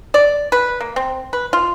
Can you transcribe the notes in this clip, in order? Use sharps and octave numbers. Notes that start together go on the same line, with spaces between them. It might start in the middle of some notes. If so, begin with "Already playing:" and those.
D5
B4
A#3
C4
B4
F4